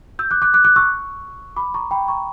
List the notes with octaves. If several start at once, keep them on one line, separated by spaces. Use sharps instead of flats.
E6 G6
D6 F#6
D6 F#6
D6 F#6
D6 F#6
C#6 E6
B5 D6
A#5 C#6
G5 B5
A#5 C#6